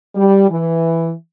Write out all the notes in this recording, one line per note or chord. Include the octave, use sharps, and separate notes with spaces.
G3
E3